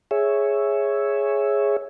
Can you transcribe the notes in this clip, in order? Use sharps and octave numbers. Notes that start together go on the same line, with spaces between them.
G#4 C#5 E5